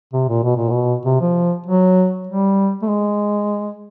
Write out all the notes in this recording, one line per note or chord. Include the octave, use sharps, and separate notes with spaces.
C3
A#2
B2
A#2
B2
C3
F3
F#3
G3
A3
G#3